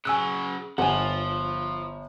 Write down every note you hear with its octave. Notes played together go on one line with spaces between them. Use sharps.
C#3 F#3 G#5 E6 F#6
G1 F3 F#5 G#5